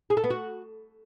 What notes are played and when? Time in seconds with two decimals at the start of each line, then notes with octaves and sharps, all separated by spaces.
0.10 G#4
0.17 A4
0.24 B3
0.30 F#4